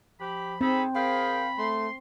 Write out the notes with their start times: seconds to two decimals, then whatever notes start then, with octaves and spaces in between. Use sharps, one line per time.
0.20 F3 G4 B5
0.61 C4 D#4 G#4 A4 B5
0.96 G#4 A#4 F5 G5 B5
1.59 A3 C6